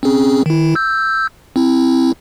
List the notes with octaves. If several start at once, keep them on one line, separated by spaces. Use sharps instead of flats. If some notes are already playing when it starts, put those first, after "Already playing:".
C4 C#4 G#4
D#3 E4
E6 G6
C4 E4